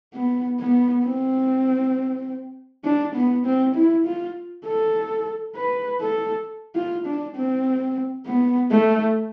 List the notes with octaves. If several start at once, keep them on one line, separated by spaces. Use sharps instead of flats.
B3
B3
C4
D4
B3
C4
E4
F4
A4
B4
A4
F4
D4
C4
B3
A3